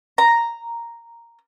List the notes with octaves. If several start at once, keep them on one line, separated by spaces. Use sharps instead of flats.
A#5